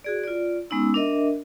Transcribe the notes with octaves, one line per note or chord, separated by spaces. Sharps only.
F#4 G#4 D5
F4 D5
G#3 B3 C#4 D#4 E6
D4 A#4 D#5 E5